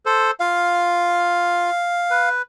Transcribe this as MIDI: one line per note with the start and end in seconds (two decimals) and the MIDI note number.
0.06 0.31 69
0.06 0.31 72
0.40 1.70 65
0.40 2.29 77
2.10 2.42 71